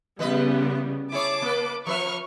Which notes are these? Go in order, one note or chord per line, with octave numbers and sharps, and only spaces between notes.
C#3 E3 G3 B3 B4 D#5
E4 G#4 C#5 A5 D6
A#3 B4
F3 B4 E5 C#6 F6